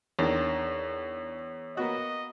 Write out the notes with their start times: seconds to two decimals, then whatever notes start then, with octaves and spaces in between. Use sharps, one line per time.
0.19 E2 D#3 A#3 D4 C#5
1.77 A#3 B3 F#4 D#5